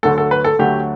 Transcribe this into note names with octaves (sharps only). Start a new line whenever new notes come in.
D2 D3 F#3 A3 A4
A4
B4
A4
D2 D3 F#3 A3 G4